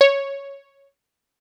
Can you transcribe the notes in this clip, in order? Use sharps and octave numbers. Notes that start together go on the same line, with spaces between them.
C#5